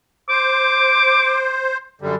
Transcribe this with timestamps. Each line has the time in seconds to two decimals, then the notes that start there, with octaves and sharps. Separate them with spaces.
0.29 C5 D6
2.02 F#2 D3 G3